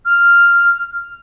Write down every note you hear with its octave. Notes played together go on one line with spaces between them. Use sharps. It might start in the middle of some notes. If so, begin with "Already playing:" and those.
F6